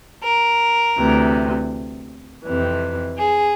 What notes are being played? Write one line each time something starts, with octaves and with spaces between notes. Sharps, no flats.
A#4
D2 C3 E3
F2 C3 E3
G#4